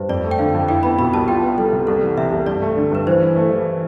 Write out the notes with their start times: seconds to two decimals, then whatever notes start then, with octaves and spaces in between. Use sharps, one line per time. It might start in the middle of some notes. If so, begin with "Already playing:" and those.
Already playing: G2 B4 C5
0.09 F2 D5
0.24 A3
0.31 G5
0.39 D3 F5
0.54 F2
0.69 E4 G5
0.83 B3 B5
0.98 B2 B5
1.13 C2 A5
1.28 F4 G5
1.43 B3
1.58 G3 A4
1.73 C3
1.87 C2 A4
2.02 E3
2.18 C3 E5
2.32 C2
2.47 G2 D5
2.62 A3
2.77 D3
2.91 G2 B4
3.07 E3 C5
3.22 E4
3.36 A3
3.51 E3